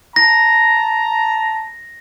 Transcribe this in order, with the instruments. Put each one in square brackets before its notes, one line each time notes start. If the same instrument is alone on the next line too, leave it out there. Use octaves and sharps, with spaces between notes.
[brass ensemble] A5 A#5 [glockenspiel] A#6